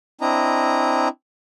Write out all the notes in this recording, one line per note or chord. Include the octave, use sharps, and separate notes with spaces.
C4 D4 E4 D#5 A#5